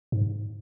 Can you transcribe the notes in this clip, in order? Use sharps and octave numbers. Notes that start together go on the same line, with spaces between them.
G#2